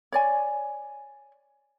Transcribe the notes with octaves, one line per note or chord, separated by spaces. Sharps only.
C#5 D5 G#5